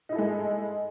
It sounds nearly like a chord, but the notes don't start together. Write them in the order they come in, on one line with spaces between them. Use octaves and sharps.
D#4 E4 A4 G#3